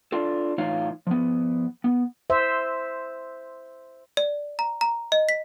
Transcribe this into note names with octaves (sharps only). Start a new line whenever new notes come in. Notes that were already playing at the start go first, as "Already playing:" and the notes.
D4 F4 A4
A2 E3 D#4 F4 C#5 F5
F3 B3
B3
C5 E5
D5
A#5
A#5
D#5
B6